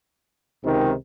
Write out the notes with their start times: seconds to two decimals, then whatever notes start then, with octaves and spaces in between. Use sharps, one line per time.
0.62 C#2 C3 D#3